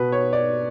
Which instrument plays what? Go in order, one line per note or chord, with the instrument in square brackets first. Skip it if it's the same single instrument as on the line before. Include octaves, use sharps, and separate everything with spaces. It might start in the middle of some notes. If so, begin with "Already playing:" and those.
Already playing: [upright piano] B2 B4
C#5
D5